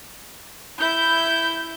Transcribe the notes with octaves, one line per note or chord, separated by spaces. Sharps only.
E4 G6